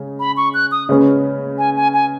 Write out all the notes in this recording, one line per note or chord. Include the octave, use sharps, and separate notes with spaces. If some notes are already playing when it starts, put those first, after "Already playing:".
Already playing: C#3 G#3 G#4
B5
C#6
F#6
D#6
C#3 G#3 C#4 B4
G#5
G#5
G#5